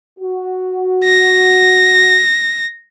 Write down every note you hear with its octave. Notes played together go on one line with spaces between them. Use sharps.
F#4
A#6